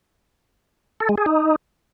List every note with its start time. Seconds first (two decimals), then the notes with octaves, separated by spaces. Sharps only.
1.00 A4
1.09 G#3
1.18 G#4
1.26 D#4